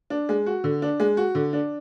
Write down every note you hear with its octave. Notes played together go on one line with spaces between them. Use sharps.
D4
G#3
F#4
D3
D4
G#3
F#4
D3
D4